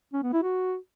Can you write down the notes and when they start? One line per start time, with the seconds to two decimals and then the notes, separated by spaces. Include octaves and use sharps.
0.13 C#4
0.23 B3
0.33 E4
0.43 F#4